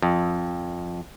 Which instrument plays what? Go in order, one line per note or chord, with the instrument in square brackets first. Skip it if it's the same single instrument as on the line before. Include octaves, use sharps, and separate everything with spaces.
[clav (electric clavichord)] F2